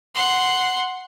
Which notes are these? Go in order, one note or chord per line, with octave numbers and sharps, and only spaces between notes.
F#5 C6